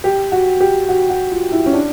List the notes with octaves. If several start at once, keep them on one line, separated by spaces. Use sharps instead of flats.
G4
F#4
G4
F#4
F#4
F4
E4
C#4
D4